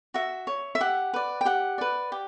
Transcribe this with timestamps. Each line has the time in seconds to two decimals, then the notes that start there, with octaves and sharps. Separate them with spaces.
0.14 F#4 E5
0.47 C#5
0.75 E5
0.81 G4 F#5
1.14 B4 D5
1.41 G5
1.45 G4 F#5
1.78 B4 D5
2.12 G4